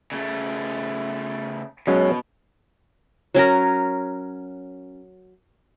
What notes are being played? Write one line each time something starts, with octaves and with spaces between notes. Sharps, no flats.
C#3 A3
B2 F#3 G#3 C#4
F#3 C#4 A#4 A#5